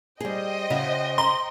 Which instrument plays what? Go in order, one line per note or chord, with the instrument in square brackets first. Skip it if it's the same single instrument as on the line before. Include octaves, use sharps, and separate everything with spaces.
[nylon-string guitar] G3 G#4 [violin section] C5 D#5 G5
[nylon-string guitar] C#3 F#4 E5
[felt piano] A#5 [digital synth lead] C6